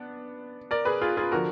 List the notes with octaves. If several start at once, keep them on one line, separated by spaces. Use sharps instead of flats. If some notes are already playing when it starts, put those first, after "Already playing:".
Already playing: B3 D4
A#4 D5
G#4 B4
F4 G#4
F4 G#4
D3 F3 F#4 A#4